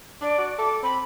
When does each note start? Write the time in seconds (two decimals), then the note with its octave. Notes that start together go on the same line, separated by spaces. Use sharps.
0.21 D4 D5
0.38 F#4
0.58 A4 D6
0.83 C4 B5